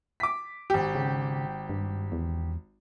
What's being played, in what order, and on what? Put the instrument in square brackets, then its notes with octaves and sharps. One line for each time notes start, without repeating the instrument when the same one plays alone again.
[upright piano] D6 B6
G#1 G4
[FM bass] C#3
G2
E2